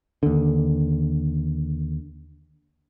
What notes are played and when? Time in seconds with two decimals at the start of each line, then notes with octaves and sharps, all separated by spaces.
0.23 D#2 D3